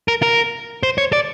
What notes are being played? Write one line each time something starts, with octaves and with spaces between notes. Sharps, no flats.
A#4
A#4
C5
C#5
D5